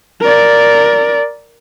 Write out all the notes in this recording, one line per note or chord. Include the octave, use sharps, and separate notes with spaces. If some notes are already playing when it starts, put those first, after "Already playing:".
A#4 D5